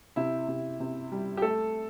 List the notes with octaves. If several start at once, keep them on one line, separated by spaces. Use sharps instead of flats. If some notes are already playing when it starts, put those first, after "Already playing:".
C3 E4
C3
C3
G3
G4
A3 A4